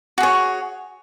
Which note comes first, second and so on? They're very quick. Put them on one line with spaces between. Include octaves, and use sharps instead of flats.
F#4 G#4 C#5